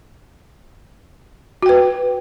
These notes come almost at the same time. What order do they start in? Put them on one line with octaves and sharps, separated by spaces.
F#4 G5 B4